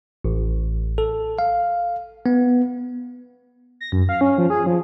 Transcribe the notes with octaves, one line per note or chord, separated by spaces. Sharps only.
A1
A4
F5
B3
A#6
F#2
F5
C#4
F3
G#4
F3